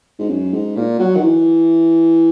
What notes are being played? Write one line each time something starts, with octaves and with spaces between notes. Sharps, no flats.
G#2
F#2
G#2
A#2
F#3
D#3
E3